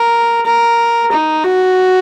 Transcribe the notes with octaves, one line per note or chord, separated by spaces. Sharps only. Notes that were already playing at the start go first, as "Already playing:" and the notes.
Already playing: A#4
A#4
D#4
F#4